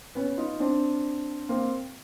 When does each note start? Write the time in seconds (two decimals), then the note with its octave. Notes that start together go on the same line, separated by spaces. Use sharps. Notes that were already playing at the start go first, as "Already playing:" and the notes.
0.15 B3 C#4
0.37 D#4 F4
0.60 C4 D4
1.49 A#3 C4